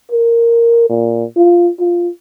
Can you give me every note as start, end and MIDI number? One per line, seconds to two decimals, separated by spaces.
0.12 0.86 70
0.90 1.25 46
1.37 1.70 65
1.80 2.09 65